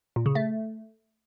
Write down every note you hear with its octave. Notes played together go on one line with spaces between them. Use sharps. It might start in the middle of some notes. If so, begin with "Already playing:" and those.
A#2
C#3
A3